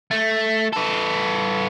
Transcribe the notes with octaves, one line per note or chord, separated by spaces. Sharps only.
A3
B3 A4